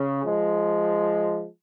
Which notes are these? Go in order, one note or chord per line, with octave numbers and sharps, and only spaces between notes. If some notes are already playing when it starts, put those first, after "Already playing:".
Already playing: C#3
F3 G#3